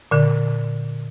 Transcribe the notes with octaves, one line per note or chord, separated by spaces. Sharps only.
A#2 D3